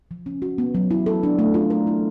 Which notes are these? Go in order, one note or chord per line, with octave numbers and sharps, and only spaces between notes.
F3
C#4
F#4
B3
F#3
E4
A4
D4
A3
F4
A#4
E4